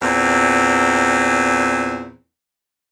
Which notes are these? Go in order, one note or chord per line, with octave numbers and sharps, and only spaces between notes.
E2 A#2 C4